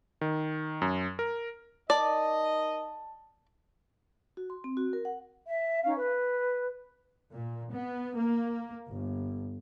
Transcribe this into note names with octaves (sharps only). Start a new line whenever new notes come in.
D#3
F#2
A#4
D#4 A#4 D5 D#5 A5
F#4
C6
C4
F#4
A#4
F#5
E5
C#4 D#4 F5
B4
A#2
B3
A#3
G1